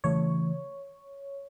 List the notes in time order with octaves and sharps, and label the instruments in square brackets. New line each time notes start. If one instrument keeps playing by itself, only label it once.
[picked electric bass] C#3 E3 A3 [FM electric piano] C#5